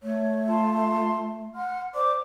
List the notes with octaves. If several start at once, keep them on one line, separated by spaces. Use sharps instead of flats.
A3 C#5
F4 A5 C6
F#5 C6 F6
C5 D5 D6